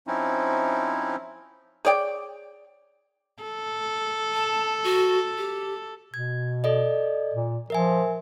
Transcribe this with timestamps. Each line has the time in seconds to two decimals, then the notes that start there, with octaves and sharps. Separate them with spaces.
0.07 F3 C4 C#4 D#4 E4
1.85 G#4 C#5 D5 G5
3.43 A4
4.34 A5
4.84 F#4
5.38 G4
6.14 B2 G#6
6.64 A4 D5 D#5
7.34 A#2
7.70 F3 A#4 E5 G#5